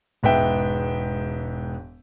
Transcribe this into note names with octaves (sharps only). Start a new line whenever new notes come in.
E1 G#2 B3 E5 G5